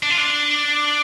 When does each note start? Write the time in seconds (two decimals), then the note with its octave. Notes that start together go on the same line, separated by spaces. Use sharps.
0.03 D4
0.10 F4
0.18 D4